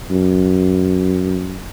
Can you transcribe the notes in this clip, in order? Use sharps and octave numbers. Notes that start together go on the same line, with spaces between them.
F#2